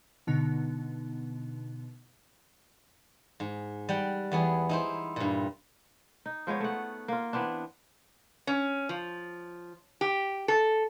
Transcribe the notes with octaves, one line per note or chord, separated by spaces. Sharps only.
B2 D3 B3 D#4
G#2
G3 F#5 G5
E2 B3 G#4
D#4 E4 C5
G2 A#2
D#4
F3 G#3 B3 C#5
A3 F#5
A#3 F4
E3 B3 C4 D4
C#4
F3
G4
A4